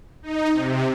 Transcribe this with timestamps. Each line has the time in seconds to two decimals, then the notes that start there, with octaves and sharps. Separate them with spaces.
0.23 D#4
0.52 C3